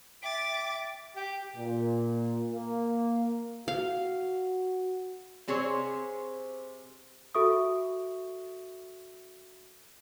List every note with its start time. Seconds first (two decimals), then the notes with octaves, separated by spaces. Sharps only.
0.22 E5 G5 D6 A6
1.16 G4
1.57 A#2
2.52 A#3
3.68 F#4 F5
5.48 C3 C4 G#4 C5 C#5
7.35 F#4 A4 E5 C#6 D#6